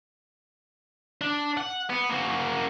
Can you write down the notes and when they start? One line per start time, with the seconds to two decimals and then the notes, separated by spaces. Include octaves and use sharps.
1.21 D4
1.57 F#5
1.90 B3
2.10 A#3 F#4